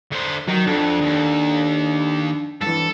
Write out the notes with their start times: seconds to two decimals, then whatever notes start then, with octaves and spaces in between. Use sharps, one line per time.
0.12 D3 C5
0.48 D#3 F#3
0.66 F2 D4 A4
1.00 D#2
2.62 G2 E3 A4